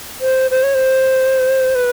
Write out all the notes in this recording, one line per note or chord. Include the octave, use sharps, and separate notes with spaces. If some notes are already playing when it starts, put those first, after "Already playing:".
C5
C5
C#5
C5
B4